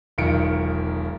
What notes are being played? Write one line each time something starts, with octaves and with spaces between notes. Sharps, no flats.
E1 B1 D#3 F4 C#7 D7